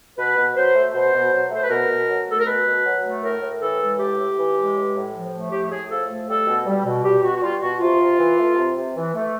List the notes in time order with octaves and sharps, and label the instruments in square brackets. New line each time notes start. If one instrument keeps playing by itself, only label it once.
[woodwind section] B2 B4
B2
F#3 C5
A3
B2 C5
B2
F#3
A3 C5
B4
B2 A#4
B2
F#3
A3 A4
A#4
B2 B4
B2
F#3
A3
A2 A#4
A2
E3 A4
G#3
A2 G4
A2
E3
G#3
A2
A2
F3
A3
A2 G4
A2 G#4
F3 A4
A3
G3 A4
B2
G3
B2
G3 G4
B2 F#4
F#4
G3 F4
B2 F#4
C3 F4
C3
E3
A3
C3
C3
E3
A3